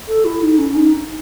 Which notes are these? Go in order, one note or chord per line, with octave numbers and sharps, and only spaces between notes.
A4
E4
D#4
C#4
D#4